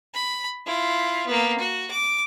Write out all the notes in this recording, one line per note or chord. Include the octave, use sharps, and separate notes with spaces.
B5
E4 F4
A#3 B3
F#4
D6